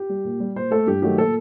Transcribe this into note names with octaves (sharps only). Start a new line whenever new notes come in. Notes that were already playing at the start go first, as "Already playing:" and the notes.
Already playing: G4
G3
A#2
G3
A#2 C5
A3 A4
G2 G4
D#3 F#3 A3 G4
A#2 A4